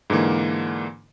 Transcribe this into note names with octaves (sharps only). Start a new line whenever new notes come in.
G#2 D3 E3 A#3